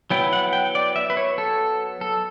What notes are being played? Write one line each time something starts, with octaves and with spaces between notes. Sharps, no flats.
F#3 B3 E4 G5
F#5
G5
D5
E5
B4
C#5
A4
A4